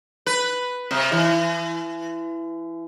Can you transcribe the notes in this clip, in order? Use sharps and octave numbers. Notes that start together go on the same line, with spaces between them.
B4
C3
E3